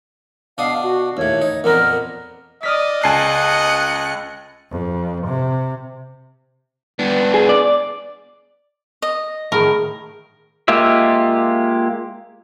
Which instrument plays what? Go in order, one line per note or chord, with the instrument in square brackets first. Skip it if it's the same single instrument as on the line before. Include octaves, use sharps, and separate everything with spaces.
[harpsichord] B2 D4 D#6 [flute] F5
[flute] F#4
[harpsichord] D#2 A2 [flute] C#5
[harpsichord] D#4
[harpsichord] F2 A#2 B3 [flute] A#4
[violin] D5 [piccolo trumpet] D#5 [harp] D#6 F6 B6
[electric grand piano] C#2 C7 [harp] G#5 A5 [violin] F#6 C#7
[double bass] F2
C3
[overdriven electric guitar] B3 D4
[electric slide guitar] G#4
D5
[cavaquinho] D#5
[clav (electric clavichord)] A2 D#3 [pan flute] G#4 [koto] A#4
[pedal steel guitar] G#3 A#3 F4 G4 E5